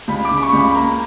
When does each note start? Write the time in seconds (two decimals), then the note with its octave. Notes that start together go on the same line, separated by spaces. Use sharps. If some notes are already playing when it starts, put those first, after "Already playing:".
0.08 C#2 B5
0.25 D6
0.31 C#3
0.37 B5
0.42 C#6
0.53 C#2
0.58 B5
0.75 A#3 A#5